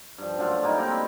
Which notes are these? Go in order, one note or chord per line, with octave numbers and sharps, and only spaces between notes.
G2 F3
F#2 D3 A3 F4
G3 G#3 A#3 D#4
C4 G4 A#4 D5
B5